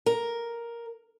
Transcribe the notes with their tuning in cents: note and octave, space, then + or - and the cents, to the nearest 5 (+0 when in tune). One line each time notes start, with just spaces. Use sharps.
A#4 +5